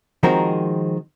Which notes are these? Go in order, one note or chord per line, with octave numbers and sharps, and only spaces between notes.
D#3 F3 G#3 C4 F#4 A#4